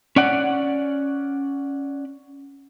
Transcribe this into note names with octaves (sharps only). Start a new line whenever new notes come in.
C#4 D5 F#5